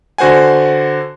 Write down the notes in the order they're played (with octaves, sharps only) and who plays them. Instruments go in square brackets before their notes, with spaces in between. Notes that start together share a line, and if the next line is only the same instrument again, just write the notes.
[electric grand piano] D3 F#4 C5 F#5 G#5